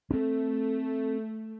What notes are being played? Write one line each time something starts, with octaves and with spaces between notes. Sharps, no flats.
A3 C4 C#4